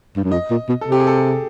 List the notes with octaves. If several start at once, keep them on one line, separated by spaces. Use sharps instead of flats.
G2
F#2
F2 D#5
A#2
B2
A4
C3 G4
G#4
A4